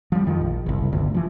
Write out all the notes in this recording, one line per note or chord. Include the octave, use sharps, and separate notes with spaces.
F3 G3
F2 D#3 F3
A#1
F#1 C2
G1 D2
E3 F3